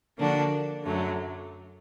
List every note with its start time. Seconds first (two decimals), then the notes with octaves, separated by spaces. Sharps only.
0.17 D3 F3 A#3 D4 F#4
0.84 F#2 D3 F#3 A3